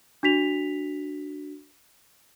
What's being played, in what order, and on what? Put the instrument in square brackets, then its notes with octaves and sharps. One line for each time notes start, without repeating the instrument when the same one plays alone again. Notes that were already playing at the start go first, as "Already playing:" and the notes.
[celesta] D4 F#4 B6 F7